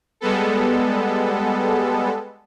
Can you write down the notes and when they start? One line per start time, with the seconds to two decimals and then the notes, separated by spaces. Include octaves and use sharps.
0.21 G3 G#3 B3 A4